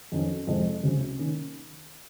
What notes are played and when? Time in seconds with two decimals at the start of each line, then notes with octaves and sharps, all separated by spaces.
0.12 F2 D#3 F#3 C#4
0.47 F2 C3 F3 G#3
0.83 C#2 C3 F#3 C#4
1.18 D#3 A#3 C#4